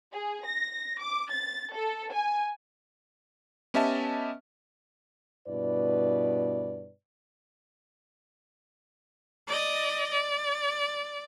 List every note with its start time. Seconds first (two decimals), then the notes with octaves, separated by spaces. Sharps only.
0.12 G#4
0.44 A#6
1.00 D6
1.29 A6
1.74 A4
2.11 G#5
3.74 B3 C#4 G4 D#5 E5 A5
5.48 G2 B2 E4 B4 D5
9.47 D5 D#5
10.11 D5